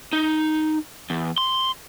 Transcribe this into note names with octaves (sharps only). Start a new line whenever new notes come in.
D#4
E2
C6